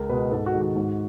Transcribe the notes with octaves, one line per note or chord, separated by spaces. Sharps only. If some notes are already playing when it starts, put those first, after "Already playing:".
Already playing: C#2 A#4
B2 G#3 B4
G#2 A4
F#4
D#3 G#3
F#4
G#2